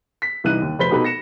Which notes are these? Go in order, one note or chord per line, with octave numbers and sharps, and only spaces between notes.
B6
C2 E3 D#4 F#6 D#7
D#2
F1 B4 C5 B6 G7
B2 D#4 G4 A4 B4
A#6 C#7 E7